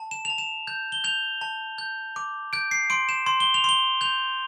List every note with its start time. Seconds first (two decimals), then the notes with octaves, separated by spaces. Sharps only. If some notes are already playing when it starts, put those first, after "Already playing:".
Already playing: A5
0.11 E7
0.25 F7
0.30 A5
0.38 E7
0.67 G6
0.92 G7
1.04 G6 F7
1.41 A5
1.78 G6
2.16 D6
2.53 G6 D7
2.71 C7
2.90 C6 D7
3.09 E7
3.26 C6
3.40 G7
3.54 F7
3.64 C6 G7
4.01 G6 F7